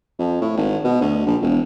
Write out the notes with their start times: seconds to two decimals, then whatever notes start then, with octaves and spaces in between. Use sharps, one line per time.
0.19 F2
0.41 A2
0.57 G#1
0.84 B2
1.01 D2
1.26 A#1
1.42 E1